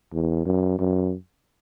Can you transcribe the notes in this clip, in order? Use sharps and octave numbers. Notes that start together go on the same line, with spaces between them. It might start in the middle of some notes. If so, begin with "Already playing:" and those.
E2
F#2
F#2